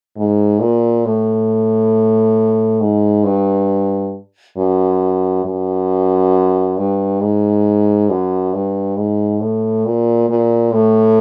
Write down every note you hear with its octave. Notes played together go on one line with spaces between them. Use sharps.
G#2
A#2
A2
G#2
G2
F#2
F#2
G2
G#2
F#2
G2
G#2
A2
A#2
A#2
A2